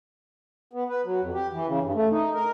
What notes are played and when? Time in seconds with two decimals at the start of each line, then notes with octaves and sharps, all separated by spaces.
0.73 B3
0.89 B4
1.04 F#3
1.21 F2
1.34 G4
1.53 E3
1.67 C#3
1.83 G2
1.95 A3
2.11 D#4
2.35 A#4